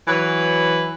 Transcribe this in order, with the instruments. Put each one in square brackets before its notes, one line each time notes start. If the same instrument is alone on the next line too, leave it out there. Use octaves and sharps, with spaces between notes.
[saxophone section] E3 F#3 B4